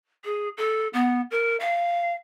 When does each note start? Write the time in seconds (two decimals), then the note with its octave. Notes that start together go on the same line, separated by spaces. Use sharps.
0.25 G#4
0.57 A4
0.93 B3
1.31 A#4
1.60 F5